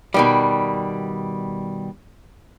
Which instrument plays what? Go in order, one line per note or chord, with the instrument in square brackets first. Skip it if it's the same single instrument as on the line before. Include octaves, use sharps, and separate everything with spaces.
[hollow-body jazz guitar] B2 D#3 G3